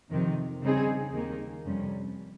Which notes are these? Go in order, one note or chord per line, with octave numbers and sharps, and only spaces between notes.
F2 C3 D#3
C#3 G3 C4 D#4 G#4
D#2 D#3 A#3 D#4
F2 C3 G3 C#4